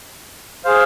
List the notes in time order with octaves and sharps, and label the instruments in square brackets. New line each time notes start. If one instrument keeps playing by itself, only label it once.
[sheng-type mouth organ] G#4 C5 F5